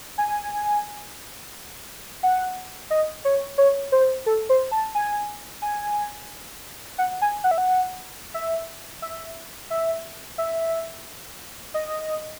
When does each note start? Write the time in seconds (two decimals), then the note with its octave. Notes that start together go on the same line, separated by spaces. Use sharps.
0.18 G#5
2.23 F#5
2.90 D#5
3.25 C#5
3.58 C#5
3.92 C5
4.26 A4
4.49 C5
4.71 A5
4.95 G#5
5.62 G#5
6.98 F#5
7.22 G#5
7.44 F#5
7.51 E5
7.58 F#5
8.34 E5
9.02 E5
9.70 E5
10.38 E5
11.74 D#5